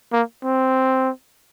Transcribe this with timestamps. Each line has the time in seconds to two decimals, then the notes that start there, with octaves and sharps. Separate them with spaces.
0.13 A#3
0.44 C4